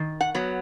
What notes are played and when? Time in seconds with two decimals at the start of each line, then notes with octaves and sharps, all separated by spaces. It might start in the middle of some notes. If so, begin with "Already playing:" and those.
Already playing: D#3
0.21 F#5
0.35 F#3 B3